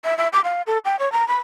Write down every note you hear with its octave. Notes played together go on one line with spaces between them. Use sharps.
E5
E5
D6
F5
A4
G5
C#5
A#5
B5